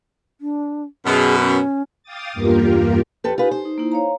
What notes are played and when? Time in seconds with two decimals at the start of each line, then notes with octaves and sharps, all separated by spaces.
0.41 D4
1.06 F#2 B2 G#4
1.39 C#4
2.03 F5 G5 D6 D#6 A6
2.33 E2 G2 A#3 F4 G4 A#4
3.24 F2 G4 A4 B4
3.38 D#4 F4 G4 B4 G#5
3.51 C5
3.65 D#4
3.78 A#3 D#4 E4
3.92 C#5 F5 A#5